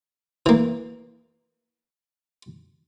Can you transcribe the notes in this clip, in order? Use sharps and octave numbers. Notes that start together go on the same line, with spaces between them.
E3 A#3